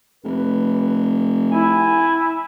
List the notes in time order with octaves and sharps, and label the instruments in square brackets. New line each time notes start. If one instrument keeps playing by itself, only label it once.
[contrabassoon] F1 [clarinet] B4
[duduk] E4 [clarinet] G#5